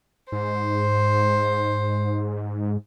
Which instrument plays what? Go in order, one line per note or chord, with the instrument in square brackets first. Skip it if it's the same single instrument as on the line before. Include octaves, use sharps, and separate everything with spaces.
[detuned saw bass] G#2 [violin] C5